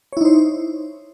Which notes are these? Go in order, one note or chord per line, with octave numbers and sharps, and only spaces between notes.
D#4 E4 C5 C#5